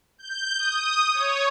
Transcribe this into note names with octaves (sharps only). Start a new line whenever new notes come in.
G6
D#6
C#5